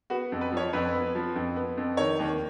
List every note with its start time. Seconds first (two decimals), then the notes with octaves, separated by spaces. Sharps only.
0.10 B3 F#4
0.32 F2
0.41 B4
0.52 F3 C#5
0.73 F2 B4
0.94 B3
1.15 F3
1.35 F2
1.56 B3
1.77 F2
1.97 D#3 C#5
2.19 D#2